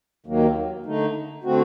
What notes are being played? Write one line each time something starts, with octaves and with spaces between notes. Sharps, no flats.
D#2 D#3 F#3 A#3
D3 A3 D#4
D3 A3 C4 F#4